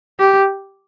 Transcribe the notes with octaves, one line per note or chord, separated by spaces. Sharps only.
G4